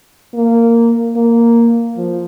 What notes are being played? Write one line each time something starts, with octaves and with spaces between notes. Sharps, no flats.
A#3
A#3
F3